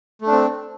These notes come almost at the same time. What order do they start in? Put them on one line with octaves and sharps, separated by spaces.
A3 D4 C4